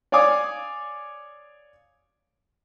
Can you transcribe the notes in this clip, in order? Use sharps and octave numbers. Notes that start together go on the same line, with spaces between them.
C#5 D5 F5 G#5 D6 D#6